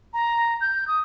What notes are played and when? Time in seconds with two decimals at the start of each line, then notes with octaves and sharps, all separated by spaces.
0.14 A#5
0.61 G6
0.88 D#6